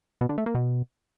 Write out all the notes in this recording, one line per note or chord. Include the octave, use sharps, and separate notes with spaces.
B2
D3
A3
A#3
B2